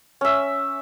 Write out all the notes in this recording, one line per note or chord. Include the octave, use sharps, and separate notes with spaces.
C#4 E5